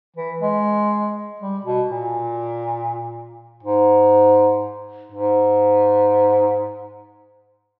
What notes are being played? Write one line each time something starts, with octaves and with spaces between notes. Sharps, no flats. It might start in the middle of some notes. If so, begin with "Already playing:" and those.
E3
G#3
G3
B2
A#2
G#2
G#2